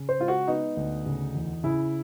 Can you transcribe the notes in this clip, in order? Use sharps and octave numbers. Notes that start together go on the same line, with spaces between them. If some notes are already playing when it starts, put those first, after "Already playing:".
Already playing: C#3
C5
G#3 F4
F#4
B3 D#4
D2
C#3
E2
C#3 E4